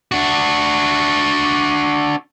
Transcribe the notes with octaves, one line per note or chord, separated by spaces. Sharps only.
D4 F#4